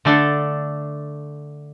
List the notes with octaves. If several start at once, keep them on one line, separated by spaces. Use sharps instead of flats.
D3 A3 D4 A4